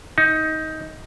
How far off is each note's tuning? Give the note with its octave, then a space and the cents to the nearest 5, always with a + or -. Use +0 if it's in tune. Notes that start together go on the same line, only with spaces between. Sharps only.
D#4 +15